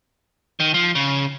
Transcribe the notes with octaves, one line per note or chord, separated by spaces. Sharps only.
D#3
F3
C#3